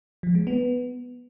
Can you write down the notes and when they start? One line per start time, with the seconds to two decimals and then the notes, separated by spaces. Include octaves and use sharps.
0.23 F3
0.35 G#3
0.47 B3